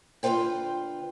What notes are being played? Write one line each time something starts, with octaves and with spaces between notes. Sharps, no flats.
D3 F4 F#4 B4 C5 G5